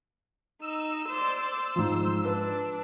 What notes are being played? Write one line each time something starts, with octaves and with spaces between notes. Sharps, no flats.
D#4 E6
C5 D5
G#2 F3 C5
D4 B4